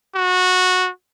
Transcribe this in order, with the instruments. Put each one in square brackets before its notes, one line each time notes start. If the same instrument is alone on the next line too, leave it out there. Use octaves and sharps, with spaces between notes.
[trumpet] F#4